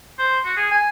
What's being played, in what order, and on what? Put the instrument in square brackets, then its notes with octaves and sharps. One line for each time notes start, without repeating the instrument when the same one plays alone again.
[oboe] C5
F#4
G#4
G#5